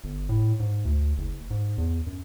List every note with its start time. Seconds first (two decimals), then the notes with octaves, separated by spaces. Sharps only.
0.04 G1
0.29 A2
0.60 G#2
0.85 D2
1.18 F#1
1.51 G#2
1.78 E2
2.07 F#2